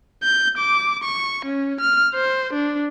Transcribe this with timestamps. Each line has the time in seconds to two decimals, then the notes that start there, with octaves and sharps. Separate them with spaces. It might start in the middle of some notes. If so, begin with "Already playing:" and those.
0.23 G6
0.58 D6
1.03 C#6
1.45 C#4
1.80 F6
2.15 C5
2.53 D4